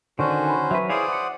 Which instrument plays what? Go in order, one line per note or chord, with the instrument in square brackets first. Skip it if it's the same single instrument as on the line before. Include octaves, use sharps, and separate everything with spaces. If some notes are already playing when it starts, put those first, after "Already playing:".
[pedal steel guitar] D3 D#3 D4 [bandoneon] C#4 F#4 C5 [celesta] D5
[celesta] G#5 B5
[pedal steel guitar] F#3 B4 [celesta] E5 C#6
[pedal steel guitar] E4 G#4 F5 [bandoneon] C5 D5 D#6
[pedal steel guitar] F#5 [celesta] D6 C#7